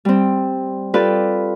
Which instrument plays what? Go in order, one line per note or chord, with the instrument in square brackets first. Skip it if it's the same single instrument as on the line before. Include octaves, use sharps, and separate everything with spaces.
[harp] G3 C4
F4 G4 A4 B4 D5